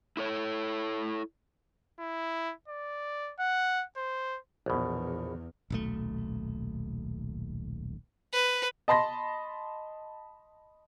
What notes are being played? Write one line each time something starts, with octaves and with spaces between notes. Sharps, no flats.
E4 A4 C#5
E4
D5
F#5
C5
A#1 E2 B2
D#1 B1 A3
B4
D#5 A5 B5 C6 A#6